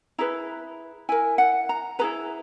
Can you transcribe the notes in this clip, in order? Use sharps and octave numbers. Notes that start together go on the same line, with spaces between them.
E4 G#4 B4 A#5
E4 A#4 G#5
F#5
A#5
E4 G#4 B4 A#5